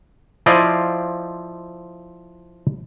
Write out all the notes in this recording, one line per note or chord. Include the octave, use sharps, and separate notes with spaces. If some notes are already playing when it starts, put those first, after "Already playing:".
F3 E4 C5 D5 D#5 F5